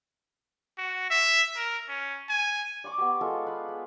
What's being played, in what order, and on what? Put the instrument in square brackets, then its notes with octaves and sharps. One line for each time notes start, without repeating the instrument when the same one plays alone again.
[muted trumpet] F#4
E5
A#4
C#4
G#5
[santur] D5 G#5 C#6 D6
B3 G4
G#3 F4 A4
B4 F5
G#4